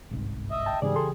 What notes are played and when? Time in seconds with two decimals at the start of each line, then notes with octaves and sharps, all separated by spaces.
0.11 G1 C2 G#2
0.51 D#5 E5
0.66 G5 A5
0.82 G#2 C#3 E3 G3 G#4 D5
0.96 A4 C6